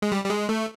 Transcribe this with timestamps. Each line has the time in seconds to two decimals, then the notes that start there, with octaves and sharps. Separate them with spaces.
0.02 G#3
0.12 G3
0.24 G3
0.30 G#3
0.49 A3